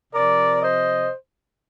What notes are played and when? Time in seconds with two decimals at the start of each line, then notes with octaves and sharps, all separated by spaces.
0.13 C3 F3 A#4 D5
0.61 C5 D#5